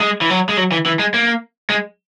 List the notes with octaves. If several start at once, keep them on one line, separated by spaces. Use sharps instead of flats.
G#3
E3
F#3
G#3
F#3
E3
E3
G#3
A#3
G#3